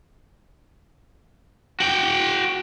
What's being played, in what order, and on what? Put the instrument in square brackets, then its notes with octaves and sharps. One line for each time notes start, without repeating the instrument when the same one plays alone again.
[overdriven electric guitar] F#4 G5